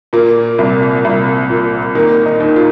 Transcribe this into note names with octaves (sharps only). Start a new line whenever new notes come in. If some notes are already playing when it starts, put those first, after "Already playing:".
A#2 A#3
C2
C2
A#2
D#3 A#3
D#4
D#2
F4